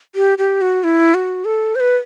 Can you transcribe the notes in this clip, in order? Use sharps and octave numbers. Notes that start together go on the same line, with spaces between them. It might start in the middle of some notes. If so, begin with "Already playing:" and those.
G4
G4
F#4
E4
F#4
A4
C5
B4